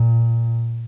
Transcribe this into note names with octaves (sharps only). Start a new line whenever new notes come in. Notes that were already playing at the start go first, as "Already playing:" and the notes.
Already playing: A#2